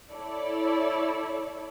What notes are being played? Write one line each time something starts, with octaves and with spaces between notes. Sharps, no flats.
E4 A4 C#5 D5